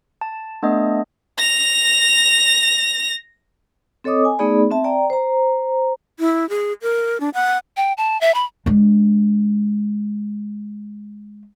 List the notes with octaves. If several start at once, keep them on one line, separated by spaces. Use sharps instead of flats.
A5
A3 B3 D4 D#5
A#6 F7
C4 A4 C#5 D#5 D6 D#6
G#5
A3 B3 D#4 G#4 D5 B5
C4 E5 A5
D5 G5 A#5
C5 A#5
E4
G#4
A#4
D4
F#5
G5
A5
E5
B5
G#3 D4